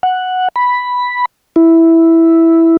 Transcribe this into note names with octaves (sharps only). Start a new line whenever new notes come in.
F#5
B5
E4